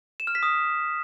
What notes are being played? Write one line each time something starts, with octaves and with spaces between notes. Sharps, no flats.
E7
F6
B6
D#6